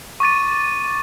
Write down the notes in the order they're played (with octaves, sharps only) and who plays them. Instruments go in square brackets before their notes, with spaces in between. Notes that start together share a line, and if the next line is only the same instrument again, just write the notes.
[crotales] C#6 D6 A6 D#7